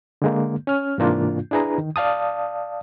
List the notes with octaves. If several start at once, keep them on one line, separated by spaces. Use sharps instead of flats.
D3 G#3 A#3
C#4 F6
G#2 C3 E3 A#3 D4 F4
D4 E4 G#4 B4 A#5
D#3
D5 F5 A5 D#6